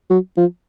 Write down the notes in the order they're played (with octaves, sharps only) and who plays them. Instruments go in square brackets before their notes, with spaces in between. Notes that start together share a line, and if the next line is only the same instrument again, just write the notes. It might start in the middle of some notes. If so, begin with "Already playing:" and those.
[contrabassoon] F#3
F3